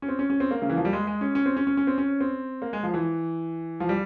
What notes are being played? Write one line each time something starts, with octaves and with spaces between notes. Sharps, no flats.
C#4
C4
C#4
C#4
C4
A#3
C#3
E3
F3
G3
G#3
G#3
C#4
C#4
C4
C#4
C#4
C#4
C4
C#4
C4
A#3
G#3
F3
E3
F3
G3